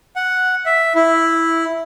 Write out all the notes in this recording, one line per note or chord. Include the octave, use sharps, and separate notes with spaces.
F#5
E5
E4